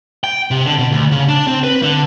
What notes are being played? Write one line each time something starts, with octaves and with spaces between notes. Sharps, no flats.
G5
C3
D3
B2
D2
C#3
D4
C4
B4
D3